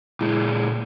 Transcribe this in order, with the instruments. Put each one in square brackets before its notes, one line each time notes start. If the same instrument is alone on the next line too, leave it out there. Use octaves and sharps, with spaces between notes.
[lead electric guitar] A#2 G#3 [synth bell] E4